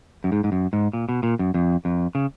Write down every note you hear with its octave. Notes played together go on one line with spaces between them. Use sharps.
F#2
G#2
G#2
F#2
G#2
A#2
B2
A#2
F#2
F2
F2
C#3